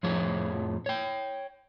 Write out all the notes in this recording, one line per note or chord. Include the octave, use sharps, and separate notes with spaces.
F2 A2 F3 G#4 C#5
C#5 G5